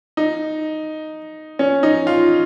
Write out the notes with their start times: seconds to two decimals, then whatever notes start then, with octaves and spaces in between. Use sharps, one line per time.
0.17 D#4
1.59 C#4
1.83 D#4
2.07 F4